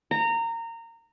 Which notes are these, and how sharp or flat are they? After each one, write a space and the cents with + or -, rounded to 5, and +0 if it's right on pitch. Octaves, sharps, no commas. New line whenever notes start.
A#5 -20